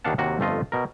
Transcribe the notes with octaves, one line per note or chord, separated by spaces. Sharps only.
D#2 D#3 D4 F5 F#5 A5
D#2 C3 A#3 F#4
G1 F2 A3 F4 D#5
B2 A#4